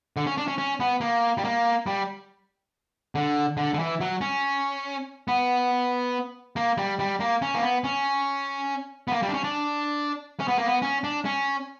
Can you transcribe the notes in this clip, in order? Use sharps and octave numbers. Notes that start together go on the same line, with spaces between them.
D3
C#4
D4
C#4
C#4
B3
A#3
G3
A#3
G3
D3
D3
D3
E3
F#3
C#4
B3
A#3
G3
G3
A#3
C#4
A#3
B3
C#4
B3
A#3
G3
D4
C#4
D4
C#4
B3
A#3
B3
C#4
D4
C#4